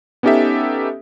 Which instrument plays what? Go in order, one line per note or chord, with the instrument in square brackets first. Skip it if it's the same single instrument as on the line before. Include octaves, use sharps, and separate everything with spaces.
[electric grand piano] B3 C#4 D#4 G4 A4 E5